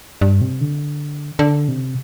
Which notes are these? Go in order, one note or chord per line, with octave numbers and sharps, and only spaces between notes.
G2
C3
D3
D3
C3